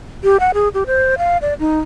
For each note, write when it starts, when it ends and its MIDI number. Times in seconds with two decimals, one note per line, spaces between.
0.24 0.37 67
0.40 0.51 78
0.54 0.69 68
0.74 0.84 67
0.87 1.15 72
1.18 1.37 77
1.42 1.54 74
1.60 1.80 63